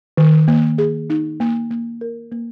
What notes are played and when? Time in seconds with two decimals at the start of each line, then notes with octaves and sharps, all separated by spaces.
0.17 D#3
0.48 A#3
0.78 G#4
1.10 D#4
1.40 A#3
1.71 A#3
2.01 A#4
2.32 A#3